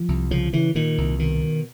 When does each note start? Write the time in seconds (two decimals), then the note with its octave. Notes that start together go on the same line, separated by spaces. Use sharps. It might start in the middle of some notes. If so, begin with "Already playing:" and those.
Already playing: F3
0.08 C2
0.31 C#3 F3
0.53 C#3 E3
0.75 A#2 D#3
0.98 C2
1.19 B2 D#3
1.41 B2